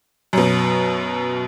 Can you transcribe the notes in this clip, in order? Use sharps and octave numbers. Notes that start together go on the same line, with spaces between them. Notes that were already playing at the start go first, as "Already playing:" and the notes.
F#2 B2